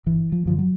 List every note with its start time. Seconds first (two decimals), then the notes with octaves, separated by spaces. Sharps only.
0.06 G1 E3
0.32 F3
0.45 F#2 D3 F3
0.59 F#3